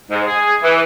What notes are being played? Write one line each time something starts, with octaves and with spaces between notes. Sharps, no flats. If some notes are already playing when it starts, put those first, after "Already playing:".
G#2
G#4
E3